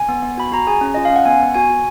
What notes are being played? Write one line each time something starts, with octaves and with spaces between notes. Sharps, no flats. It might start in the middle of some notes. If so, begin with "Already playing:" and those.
Already playing: G#5
B3
B3
F#4 B5
F#4 A#5
G#4 G#5
C#4
F4 D#5
F5
C#4
F#5
B3 G#5
B3
F#4 G#5
F#4